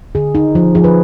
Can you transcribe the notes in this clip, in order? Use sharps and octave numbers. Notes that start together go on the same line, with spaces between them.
D3 G#4
D#4
F3
F3 G#4
B4